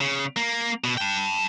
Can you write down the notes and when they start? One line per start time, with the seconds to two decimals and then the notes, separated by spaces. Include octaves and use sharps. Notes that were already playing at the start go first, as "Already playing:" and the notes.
0.01 C#3
0.36 A#3
0.84 B2
0.97 G5 A5